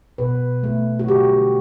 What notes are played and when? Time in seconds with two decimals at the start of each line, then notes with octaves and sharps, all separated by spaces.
0.18 B2 B4
0.63 A3
0.99 F#4
1.08 D3 G4